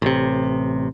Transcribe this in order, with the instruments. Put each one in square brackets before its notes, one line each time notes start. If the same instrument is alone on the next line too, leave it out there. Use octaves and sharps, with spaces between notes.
[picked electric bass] A1 C3